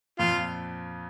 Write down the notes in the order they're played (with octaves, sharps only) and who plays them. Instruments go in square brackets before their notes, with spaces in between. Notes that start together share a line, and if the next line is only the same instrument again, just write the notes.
[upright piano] F2 A#2 [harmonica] F4